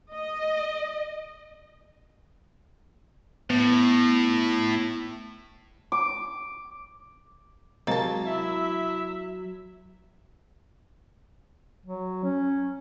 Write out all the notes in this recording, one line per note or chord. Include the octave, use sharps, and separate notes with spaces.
D#5
A2 B3
D6
C3 F#3 G#3 A#3 A5 A6
E4 E5
F#3
C#4